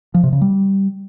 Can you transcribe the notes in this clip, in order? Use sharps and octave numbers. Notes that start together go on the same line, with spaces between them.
F3
C3
C#3
G3